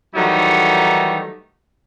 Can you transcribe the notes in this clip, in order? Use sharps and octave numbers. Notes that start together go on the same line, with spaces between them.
D#3 E3 F#3 G3 A3 D#4